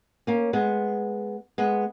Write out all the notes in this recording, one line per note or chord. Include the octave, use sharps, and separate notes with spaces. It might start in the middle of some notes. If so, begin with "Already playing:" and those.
A#3 C#4
G#3 B3
G#3 B3